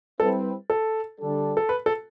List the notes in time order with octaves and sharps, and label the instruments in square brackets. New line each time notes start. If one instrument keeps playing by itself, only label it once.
[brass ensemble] G3 C4 E4 B4 [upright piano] A4
[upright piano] A4
[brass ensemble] D3 G3 D4 A4
[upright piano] A4
B4
A4